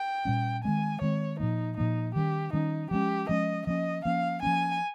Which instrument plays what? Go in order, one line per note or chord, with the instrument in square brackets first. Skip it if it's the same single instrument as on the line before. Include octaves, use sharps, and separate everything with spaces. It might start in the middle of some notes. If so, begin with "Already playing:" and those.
Already playing: [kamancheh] G5
[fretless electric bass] A#2 G3 C#4
[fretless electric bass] D#3 G#3 C4 [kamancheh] G#5
[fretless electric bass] D#3 G#3 C4 [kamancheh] C#5
[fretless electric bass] A#2 F3 A#3 [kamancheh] D#4
[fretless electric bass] A#2 F3 A#3 [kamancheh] D#4
[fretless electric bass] D#3 G3 C#4 [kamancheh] G4
[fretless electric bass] D#3 G3 C#4 [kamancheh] D#4
[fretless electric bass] F3 G#3 C#4 [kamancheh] G4
[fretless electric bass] F3 G#3 C#4 [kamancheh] D#5
[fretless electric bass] F3 A#3 C#4 [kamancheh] D#5
[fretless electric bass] F3 A#3 C#4 [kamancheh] F5
[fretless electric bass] F3 A#3 C#4 [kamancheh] G#5